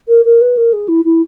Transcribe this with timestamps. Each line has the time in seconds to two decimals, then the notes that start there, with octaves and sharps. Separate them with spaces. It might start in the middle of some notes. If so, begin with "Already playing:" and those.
0.08 A#4
0.25 A#4
0.41 B4
0.57 A#4
0.73 G#4
0.88 E4
1.05 E4